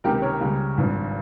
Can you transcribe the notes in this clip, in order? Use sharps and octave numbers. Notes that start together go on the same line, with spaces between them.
C#2 C3 D#3 G4 A#4
A#4 C#5
C#2 C#3 G3
G#1 G2 F3